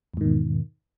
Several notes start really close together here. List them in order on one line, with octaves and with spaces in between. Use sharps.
E2 G#2 D#3 B2